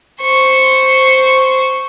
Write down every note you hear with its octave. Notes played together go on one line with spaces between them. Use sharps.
C5 C#6